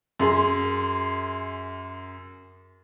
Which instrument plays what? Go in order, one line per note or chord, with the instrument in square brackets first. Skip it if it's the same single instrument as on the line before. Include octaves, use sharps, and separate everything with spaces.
[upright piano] F#2 G#4 C6